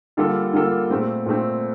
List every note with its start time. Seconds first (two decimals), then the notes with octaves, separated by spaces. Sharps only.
0.17 D3 G3 A#3 F4 A4
0.53 D3 G3 A#3 F4 A4
0.90 A#2 A3 C4
1.26 A#2 A3 C4